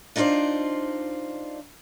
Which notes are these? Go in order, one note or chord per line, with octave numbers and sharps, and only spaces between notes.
D4 D#4 F4 F#4 C5 D5